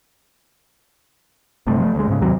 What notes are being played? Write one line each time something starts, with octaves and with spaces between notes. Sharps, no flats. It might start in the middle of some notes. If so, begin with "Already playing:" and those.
G1 G2 C3 A3
F3 G#3 A3
D2 G#3
G#2 C#3
D#2 C3 F#3